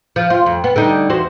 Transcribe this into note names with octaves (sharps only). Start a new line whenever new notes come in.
F3
F4
F2
B3
D3 G3 D#4
E2 F#4 C5